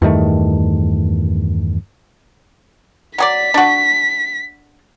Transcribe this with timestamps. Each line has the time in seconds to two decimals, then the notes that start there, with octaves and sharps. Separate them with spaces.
0.02 E2 G2 D#3 A3
3.18 F#3 G#4 D5 B6
3.54 D4 F#4